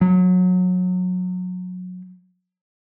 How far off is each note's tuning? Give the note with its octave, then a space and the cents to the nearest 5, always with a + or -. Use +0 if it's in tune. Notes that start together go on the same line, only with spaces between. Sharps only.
F#3 -25